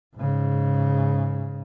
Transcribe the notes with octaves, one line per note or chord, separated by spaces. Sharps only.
G#2 C#3